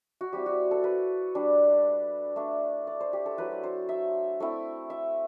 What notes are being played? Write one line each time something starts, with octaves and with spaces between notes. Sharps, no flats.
F#4
G3 C4 E4 G4
F#4
A4
B4
G3 D4
A3 D4
D5
C5
G4
A4
F#3 A3 E4 B4
C5
C5
E5
A3 C4 E4
E5